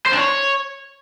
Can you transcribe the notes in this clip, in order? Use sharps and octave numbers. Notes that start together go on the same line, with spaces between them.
C5
D4
C#5